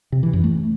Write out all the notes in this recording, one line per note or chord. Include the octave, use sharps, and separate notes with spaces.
C3
E3
F#2
A3